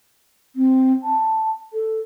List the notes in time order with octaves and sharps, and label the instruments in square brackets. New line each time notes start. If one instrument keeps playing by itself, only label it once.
[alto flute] C4
A5
A4